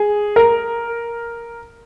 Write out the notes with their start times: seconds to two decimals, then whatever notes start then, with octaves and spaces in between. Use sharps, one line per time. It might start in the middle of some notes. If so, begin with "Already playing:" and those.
Already playing: G#4
0.36 A#4